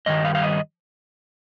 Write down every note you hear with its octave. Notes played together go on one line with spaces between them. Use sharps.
G2 D#3 G3 D#5
F5
F5
D#5